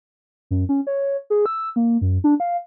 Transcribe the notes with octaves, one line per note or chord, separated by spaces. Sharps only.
F#2
C#4
C#5
G#4
E6
A#3
F#2
D4
F5